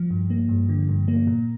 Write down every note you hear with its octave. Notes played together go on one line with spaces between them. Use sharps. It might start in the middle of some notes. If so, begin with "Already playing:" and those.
Already playing: F3
G2
A#3
G2
D3
G2
A#3
A#2